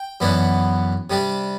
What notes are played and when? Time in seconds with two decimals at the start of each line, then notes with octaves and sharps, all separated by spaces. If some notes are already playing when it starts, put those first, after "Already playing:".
Already playing: G5
0.20 F#2 E3 B3 D4
1.10 C3 G3 D4